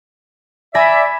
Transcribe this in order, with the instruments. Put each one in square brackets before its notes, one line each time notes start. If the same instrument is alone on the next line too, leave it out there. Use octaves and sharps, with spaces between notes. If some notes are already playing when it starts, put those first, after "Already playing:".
[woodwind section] D5 E5 [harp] G#5 B5 A#6